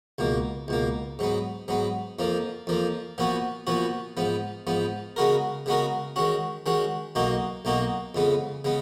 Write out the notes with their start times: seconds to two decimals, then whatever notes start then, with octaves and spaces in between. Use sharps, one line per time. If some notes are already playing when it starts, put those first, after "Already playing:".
0.18 C#2 B2 A#3
0.68 C#2 B2 A#3
1.19 G#2 F#3 B3
1.68 G#2 F#3 B3
2.19 F2 F3 A#3
2.67 F2 F3 A#3
3.18 A#2 F3 B3 F#4
3.67 A#2 F3 B3 F#4
4.17 G#2 F3 B3
4.67 G#2 F3 B3
5.16 C#3 G#3 B3 F#4 A#4
5.66 C#3 G#3 B3 F#4 A#4
6.16 D#3 G#3 C#4 F#4
6.66 D#3 G#3 C#4 F#4
7.15 B1 B2 A#3 D#4 F#4
7.65 B1 B2 A#3 D#4 F#4
8.15 F2 C#3 G#3 B3
8.64 C#3 G#3 B3